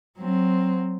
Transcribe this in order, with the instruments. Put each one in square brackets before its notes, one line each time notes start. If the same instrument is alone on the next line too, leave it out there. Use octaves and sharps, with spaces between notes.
[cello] F#3 C4